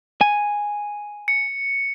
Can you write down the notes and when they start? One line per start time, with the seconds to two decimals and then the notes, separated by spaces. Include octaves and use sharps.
0.21 G#5
1.28 C#7